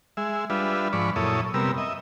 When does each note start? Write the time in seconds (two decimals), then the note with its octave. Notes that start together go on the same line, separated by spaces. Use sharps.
0.17 G#3 E5
0.50 G3 D4 F4 B4 E5
0.93 G#2 F3 D5 B5 C#6
1.16 F#2 A#2 E4 A4 C#5 D#6
1.54 C3 G3 B3 A#4 E6
1.78 D#5 E5